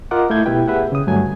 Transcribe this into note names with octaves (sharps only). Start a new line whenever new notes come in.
F4 A#4 D#5 F#5 D6
A3 E4 G6 G#6
B2 E4 G4 B4 G5
G4 G#4 B4 E5 F#5
C#3 D#6
G2 D3 F#3 A3 G#5